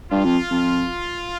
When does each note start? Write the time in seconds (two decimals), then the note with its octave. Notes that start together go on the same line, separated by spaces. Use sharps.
0.11 G2 F4
0.24 F2
0.50 F2